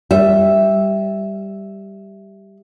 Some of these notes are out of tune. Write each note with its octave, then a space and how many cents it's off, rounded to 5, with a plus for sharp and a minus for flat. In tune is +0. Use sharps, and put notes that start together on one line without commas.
G3 +0 E5 +0